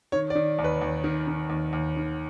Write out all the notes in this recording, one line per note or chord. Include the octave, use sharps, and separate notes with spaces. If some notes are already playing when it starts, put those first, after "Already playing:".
D#3 C#5
D5
D#3
D#2
B4
D#2
D#3
D#3
D#2
D#2
D#3